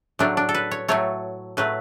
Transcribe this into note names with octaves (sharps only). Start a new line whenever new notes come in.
A2 F#3 A3 D4
D4
A4
B4
C#5
A2 F#3 A3 C#5
A2 F#3 A3 B4